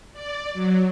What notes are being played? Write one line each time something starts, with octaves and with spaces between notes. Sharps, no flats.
D5
F#3